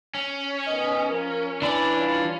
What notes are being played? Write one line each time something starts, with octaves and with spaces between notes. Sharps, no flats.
C#4
D#3 B3 D#5
F3 A#4
E3 D4 D5 B5
G3 F4